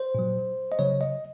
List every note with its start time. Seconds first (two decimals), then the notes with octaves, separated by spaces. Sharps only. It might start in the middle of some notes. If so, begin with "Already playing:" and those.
Already playing: C5
0.15 A#2 F#3
0.72 D#5
0.79 C#3 F#3 C#5
1.01 D#5